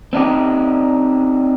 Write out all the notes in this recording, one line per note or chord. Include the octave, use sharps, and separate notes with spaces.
C4 D4 D#4 G4